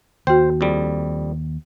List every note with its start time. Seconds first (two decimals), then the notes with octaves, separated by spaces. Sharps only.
0.27 D#2 F#4 C5 G5
0.61 F2 G3